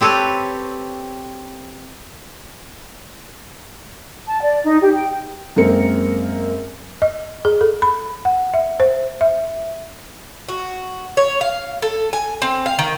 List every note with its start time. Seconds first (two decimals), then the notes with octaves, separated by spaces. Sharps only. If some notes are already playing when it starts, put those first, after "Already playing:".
0.01 C4 G4 A4 B4 C#5
4.26 A5
4.42 D5
4.65 D#4
4.80 G4
4.95 G5
5.56 F#2 G#3 A#3 C4 A#4 C#7
7.02 D#5
7.45 G#4
7.61 A4
7.82 B5
8.25 F#5
8.54 E5
8.80 C5
9.21 E5
10.49 F#4
11.17 C#5
11.41 F5
11.82 A4
12.13 G#5
12.42 C4
12.66 F5
12.79 D#3